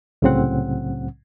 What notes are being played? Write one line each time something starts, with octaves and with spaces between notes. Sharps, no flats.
C2 A2 C#3 F#3 C4 F#5